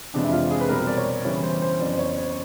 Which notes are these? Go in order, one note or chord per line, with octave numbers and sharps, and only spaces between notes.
F2 C3 E3 G#3 C4 D4
E4
F4
G#4
B4
B2 G3 C4 A#4
D5
C#5
C#3 E3 G3 B3 C#5
C5
C5
F2 C#3 F#3 B3 D5
C5
C#5
C5